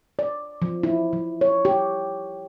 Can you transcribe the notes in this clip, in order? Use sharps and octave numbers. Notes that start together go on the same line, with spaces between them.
D5
F3
E4
F3
C#5
G4